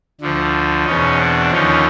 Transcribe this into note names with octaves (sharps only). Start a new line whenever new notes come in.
D2 D3 F3
E2 B2 C#4 D#4
C4 D4
D#2 D3 F3 C#4 D#4